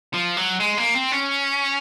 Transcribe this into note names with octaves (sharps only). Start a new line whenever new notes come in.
F3
F#3
G#3
A#3
C4
C#4